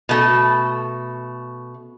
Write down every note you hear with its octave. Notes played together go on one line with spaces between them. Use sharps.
B2 A3